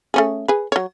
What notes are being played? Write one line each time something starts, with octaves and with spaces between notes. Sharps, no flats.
A3 C#4 G#4
G#4 B4
F#3 C#5